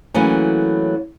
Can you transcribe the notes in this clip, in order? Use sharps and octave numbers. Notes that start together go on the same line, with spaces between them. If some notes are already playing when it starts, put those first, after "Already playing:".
E3 F#3 A3 A#3 C#4